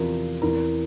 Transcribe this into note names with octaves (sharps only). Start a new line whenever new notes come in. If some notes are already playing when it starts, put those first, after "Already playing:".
Already playing: E2 C3 F3 A#4
E2 C3 E3 A#4